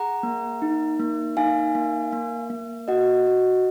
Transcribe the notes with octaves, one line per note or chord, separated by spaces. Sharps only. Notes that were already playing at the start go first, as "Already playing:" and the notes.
Already playing: G#4 F#5 A#5
A#3
D#4
A#3
D#4 F5 G#5
A#3
A#3
A#3
F#4 D#5 F#5
F#4